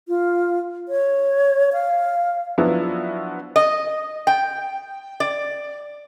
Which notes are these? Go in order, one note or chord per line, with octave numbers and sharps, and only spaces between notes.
F4
C#5
F5
F3 F#3 B3 D4 E4 F#4
D#5
G5
D5